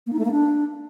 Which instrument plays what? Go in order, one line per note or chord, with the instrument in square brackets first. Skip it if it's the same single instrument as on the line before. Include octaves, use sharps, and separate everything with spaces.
[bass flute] A#3
D#4
A3
A#3
D4